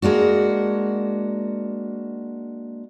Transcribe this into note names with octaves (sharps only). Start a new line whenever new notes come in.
G#3 A#3 D4 F#4